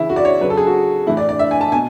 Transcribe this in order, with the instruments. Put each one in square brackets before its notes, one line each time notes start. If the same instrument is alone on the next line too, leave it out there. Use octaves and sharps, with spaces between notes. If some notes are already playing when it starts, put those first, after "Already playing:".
Already playing: [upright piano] C#3 E3 E4
F#4
D5
C#5
C#3 F#3 B4
A4
G#4
F#4
A2 E3 E4
D5
D5
E5
G#5
A5
B2 G#5